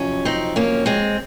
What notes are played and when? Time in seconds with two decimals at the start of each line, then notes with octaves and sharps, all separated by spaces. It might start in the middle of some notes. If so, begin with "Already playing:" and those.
Already playing: F2 C3 F#3 C#4
0.25 C4 D#4
0.56 A#3 C#4
0.86 G#3 C4